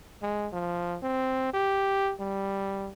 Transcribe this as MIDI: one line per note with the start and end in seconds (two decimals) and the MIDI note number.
0.22 0.48 56
0.53 0.98 53
1.03 1.52 60
1.54 2.13 67
2.20 2.90 55